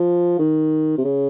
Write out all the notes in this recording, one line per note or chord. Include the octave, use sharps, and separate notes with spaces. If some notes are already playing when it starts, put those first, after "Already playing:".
Already playing: F3
D#3
C3
C#3